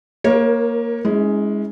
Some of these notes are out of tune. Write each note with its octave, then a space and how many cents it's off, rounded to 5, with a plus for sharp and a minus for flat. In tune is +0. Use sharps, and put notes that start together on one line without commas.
A#3 +0 A#4 +25 C#5 -20
G#3 +0 C#4 +5 E4 -35